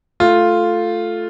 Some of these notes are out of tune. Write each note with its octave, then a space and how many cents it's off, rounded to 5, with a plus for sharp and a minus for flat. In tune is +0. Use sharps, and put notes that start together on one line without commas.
A3 +0 F4 +0